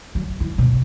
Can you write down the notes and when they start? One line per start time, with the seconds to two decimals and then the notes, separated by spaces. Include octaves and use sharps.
0.15 F#3
0.40 E3
0.58 B2